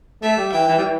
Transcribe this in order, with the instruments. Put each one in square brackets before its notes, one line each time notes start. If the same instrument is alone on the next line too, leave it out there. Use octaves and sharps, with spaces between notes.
[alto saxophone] A3 [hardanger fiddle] E5
[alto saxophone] G3
[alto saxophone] E3 [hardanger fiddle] G5
[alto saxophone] E3
G3
E3